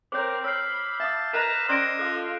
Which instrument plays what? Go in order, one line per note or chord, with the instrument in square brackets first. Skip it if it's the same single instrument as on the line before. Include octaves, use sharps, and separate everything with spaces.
[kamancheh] C4 A#4 [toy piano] C5 C#5 [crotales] D6 G6
[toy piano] C#5 [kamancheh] B5 [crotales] E6 F6 C7
[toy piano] E5 F5 D#6 [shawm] A5
[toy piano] A#4 D#5 [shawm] B4 [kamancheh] A#5 [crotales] E7
[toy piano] C#4 D5 C6 [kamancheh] C5 [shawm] D#5 [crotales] F6 F#6 D7
[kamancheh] F4 A4 [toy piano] G#4 F5 [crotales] F#6